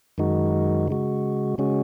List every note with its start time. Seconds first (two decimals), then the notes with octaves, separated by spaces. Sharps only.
0.18 F#2 D#3 G#3 D#4 F#4
0.88 C#3 G#3 F#4
1.58 C#3 G#3 C#4 F#4